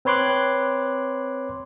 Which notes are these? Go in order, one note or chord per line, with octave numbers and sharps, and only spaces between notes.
C4 B4 C#5 C6 D6 F#6